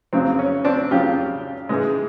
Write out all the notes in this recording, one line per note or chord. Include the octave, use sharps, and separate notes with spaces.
F2 C#3 F#3 C4
C#4
C4 D4
F2 C#3 F#3 F4 G4
G#2 E3 G#3